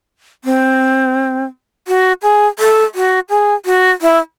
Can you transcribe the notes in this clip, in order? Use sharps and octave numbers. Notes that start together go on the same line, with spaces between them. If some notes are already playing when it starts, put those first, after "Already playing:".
C4
F#4
G#4
A4
F#4
G#4
F#4
E4